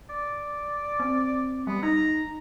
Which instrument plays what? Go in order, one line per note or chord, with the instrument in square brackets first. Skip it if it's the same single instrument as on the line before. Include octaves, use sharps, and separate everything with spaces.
[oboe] D5
[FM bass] C4
[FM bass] G3 [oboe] B3
[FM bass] D#4 [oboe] A#5